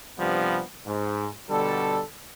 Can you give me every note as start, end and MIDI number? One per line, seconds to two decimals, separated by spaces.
0.19 0.61 43
0.19 0.61 48
0.19 0.61 53
0.19 0.61 55
0.19 0.61 59
0.86 1.28 44
1.50 2.01 47
1.50 2.01 50
1.50 2.01 55
1.50 2.01 69